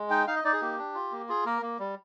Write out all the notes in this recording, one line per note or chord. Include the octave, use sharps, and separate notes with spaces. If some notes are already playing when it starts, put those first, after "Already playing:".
Already playing: G#3
D#4 G5
D#4 F5
D#5
D#4 D5
G#4
A#3 G4
D4
F4
A#3
F4 G#4
A#3 A#4
A#3
G3